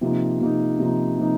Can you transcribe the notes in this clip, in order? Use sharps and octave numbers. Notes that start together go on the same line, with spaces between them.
C3 F3 A#3 D#4
C3 F3 A#3 D#4
C3 F3 A#3 D#4
C3 F3 A#3 D#4